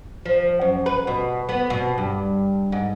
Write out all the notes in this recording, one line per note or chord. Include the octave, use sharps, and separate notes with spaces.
F3
F#2
B4
B2
B3
B2
G2
G#2